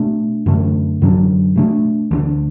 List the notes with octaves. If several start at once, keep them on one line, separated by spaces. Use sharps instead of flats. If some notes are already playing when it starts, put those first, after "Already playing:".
Already playing: B2 A3 D4
F#2 D3 A3 D4
F#2 D3 F#3 D4
B2 A3 D4
D2 D3 A3 D4